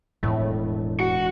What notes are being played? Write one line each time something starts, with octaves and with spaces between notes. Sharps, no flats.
E1 F2 A2
F#4